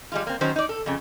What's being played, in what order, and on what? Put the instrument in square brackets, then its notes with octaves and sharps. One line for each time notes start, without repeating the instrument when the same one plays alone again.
[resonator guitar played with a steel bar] G3 G#3 F4
A#3 C4
D#3 F#3 C#4 C5
D#4 D5
A4
F2 C#3